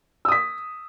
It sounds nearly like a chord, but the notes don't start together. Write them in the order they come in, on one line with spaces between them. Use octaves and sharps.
E6 D#6 B6